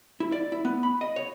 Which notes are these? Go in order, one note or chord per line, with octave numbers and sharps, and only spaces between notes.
E4
D5
E4
B3
B5
D#5
C#5